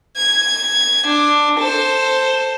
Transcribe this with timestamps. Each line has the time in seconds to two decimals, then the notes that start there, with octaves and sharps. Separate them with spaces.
0.17 G#6
1.07 D4
1.60 A4 C5